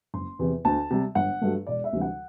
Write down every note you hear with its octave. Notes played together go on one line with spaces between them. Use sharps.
F#1 C6
E2 C3 E3
D2 A5
C3 G3
G1 F#5
G2 F#3 A3
E1 D5
E5
D2 C3 E3 G3
F#5